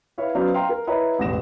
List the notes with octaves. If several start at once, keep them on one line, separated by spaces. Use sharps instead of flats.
E4 B4 C#5 E5 F5
F#3 B3 C#4 C5 D5 F5
F5 G5 A#5 C6
A#4
E4 B4 C#5 D#5 A#5
E1 A1 F2 C4 A#6 E7